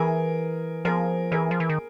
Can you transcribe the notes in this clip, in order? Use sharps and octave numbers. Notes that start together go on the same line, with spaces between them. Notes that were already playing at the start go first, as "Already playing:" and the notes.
Already playing: E3 G#4 A#4
F3 G#4 A#4
E3 G#4 A#4
F3
E3
D#3